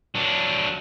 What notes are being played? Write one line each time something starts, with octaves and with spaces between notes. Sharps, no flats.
F#3 D4